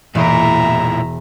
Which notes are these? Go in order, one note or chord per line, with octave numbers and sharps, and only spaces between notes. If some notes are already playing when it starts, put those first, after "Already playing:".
E1 A#2 E4 G#4 E5 A#5 D7